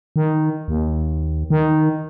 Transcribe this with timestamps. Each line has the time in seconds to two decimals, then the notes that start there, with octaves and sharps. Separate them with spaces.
0.16 D#3
0.68 D#2
1.50 D#3